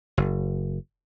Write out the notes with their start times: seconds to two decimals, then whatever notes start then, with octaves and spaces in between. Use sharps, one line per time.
0.17 F#1